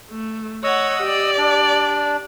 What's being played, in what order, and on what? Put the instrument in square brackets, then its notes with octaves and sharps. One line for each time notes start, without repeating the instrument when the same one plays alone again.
[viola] A3
[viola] C#5 F#5 [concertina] D#5 D#6 E6
[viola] G4 D5
[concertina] D4